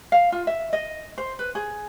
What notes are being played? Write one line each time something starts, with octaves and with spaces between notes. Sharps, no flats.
F5
F4
E5
D#5
C5
B4
G#4